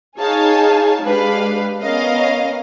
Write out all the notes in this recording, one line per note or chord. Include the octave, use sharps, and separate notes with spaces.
D#4 G#4 C#5 F5 G#5 A5
G#3 D4 G4 B4 F5
B3 C#4 A#4 D#5 F5